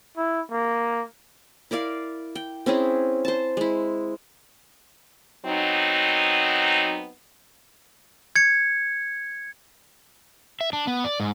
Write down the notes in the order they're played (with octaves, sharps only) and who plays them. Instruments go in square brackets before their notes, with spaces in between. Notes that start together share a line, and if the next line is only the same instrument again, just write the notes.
[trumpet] E4
A#3
[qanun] E4 A#4 D5 F5
G5
C4 C#4 E4 G#4
C5 A5
G#3 E4
[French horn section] F#3 B3 C4 D#4
[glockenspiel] G#6 C#7
[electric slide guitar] E5
D4
B3
D5
G#2